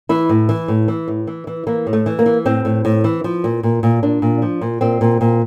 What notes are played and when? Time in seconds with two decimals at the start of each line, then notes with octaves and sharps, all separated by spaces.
0.09 E3 E4
0.29 A2
0.49 E3
0.68 A2
0.88 E3
1.08 A2
1.27 E3
1.47 E3
1.67 E3 A#3
1.87 A2
1.93 A3
2.06 E3
2.19 A#3
2.26 E3
2.45 A2 C4
2.65 A2
2.85 A2
3.04 E3
3.24 F3
3.44 A#2
3.63 A#2
3.83 A#2
4.03 A#2 D4
4.22 A#2
4.42 F3
4.61 A#2
4.81 A#2 C4
5.01 A#2
5.21 A#2